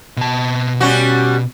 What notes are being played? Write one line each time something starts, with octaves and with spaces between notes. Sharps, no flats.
B2 A5
G3 C#4 F#4